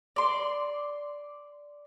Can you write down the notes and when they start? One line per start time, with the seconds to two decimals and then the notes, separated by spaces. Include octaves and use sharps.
0.16 D5 C6